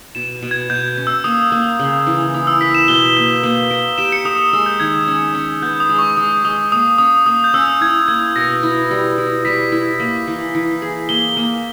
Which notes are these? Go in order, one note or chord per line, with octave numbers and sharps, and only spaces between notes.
B2 E7
B2
G#6
B2 G6
G6
C#4
E6
A#3 D#6
A#3
C#3
E3
E4 D#6
E6
A#4 B6
E7
B2 G7
A#3
A#3
A#4
G4 E7
C#7
A#4 D#6
D#6
G#3 E6
G6
D#3 G#6
C#4
C#4
B3 G6
D#6
G#3
C#6
G#3 D#6
G#3 D#6
A#3 D#6
C#4 D#6
A#3 D#6
G6
C#4 E6
E4 G#6
A#3 G#6
B2 A#6
E4
G3
E4
G3 B6
E4
A#3
E3
E3
G#4
A#3 G7
A#3